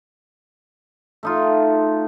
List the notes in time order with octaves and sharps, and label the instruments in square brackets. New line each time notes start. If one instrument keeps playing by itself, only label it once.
[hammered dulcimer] A3 D#4 F4